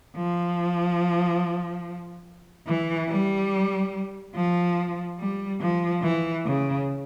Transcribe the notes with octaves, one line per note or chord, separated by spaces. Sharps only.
F3
E3
G3
F3
G3
F3
E3
C#3